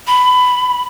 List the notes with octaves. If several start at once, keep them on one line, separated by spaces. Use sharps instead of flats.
B5